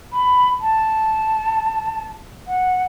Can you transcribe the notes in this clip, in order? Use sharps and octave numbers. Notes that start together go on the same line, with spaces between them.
B5
A5
F#5